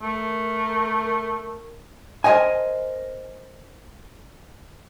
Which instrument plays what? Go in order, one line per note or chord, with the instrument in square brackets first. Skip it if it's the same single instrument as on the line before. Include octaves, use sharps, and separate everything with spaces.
[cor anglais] A3 [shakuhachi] A#4
[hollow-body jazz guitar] A#4 C5 C#5 D#5 G#5